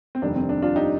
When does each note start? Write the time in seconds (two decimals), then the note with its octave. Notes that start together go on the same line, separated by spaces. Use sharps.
0.15 C4
0.21 F1 D#2 D#3 G3 D4
0.35 C4
0.49 D4
0.62 D4 F4
0.76 D#4 G4